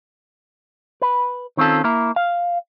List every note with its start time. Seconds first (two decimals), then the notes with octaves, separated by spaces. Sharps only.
1.02 B4
1.57 D#3 C4 C#4 F4 A4
1.84 A#3 E4 A#4
2.16 F5